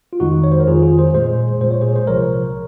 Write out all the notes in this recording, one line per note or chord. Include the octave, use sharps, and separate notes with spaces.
F4
F2 D#3 G#3 D#4 F#4
C#5
C5
A#4
F2 D#3 G#3 F4 G#4
F4 G#4
G#4 C5
A#2 G#3 G#4 C5
A#2 G#3 C5
C#5
G#4 C5
C5
C2 C3 F3 A#4 C#5